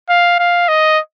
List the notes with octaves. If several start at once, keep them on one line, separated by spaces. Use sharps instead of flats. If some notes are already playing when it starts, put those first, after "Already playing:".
F5
F5
D#5